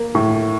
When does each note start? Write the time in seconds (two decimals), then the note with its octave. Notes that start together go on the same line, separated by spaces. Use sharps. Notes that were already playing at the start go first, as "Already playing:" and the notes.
Already playing: A#3
0.15 A2